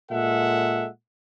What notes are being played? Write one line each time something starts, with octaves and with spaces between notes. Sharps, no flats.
A#2 G#3 A4 E5 F#5